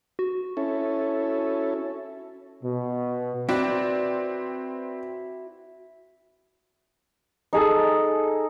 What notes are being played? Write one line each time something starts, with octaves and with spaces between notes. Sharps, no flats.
F#4
C#4 E4 A4
B2
C4 E4 F#4 B4 D5
D#4 G#4 A4